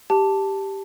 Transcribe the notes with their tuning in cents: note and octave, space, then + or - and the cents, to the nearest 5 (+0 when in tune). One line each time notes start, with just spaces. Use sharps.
G4 +0 A5 +0